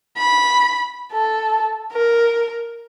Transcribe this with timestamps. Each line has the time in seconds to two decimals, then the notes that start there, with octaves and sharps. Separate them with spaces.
0.17 B5
1.12 A4
1.93 A#4